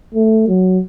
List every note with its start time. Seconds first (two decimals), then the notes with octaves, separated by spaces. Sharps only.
0.15 A3
0.48 F#3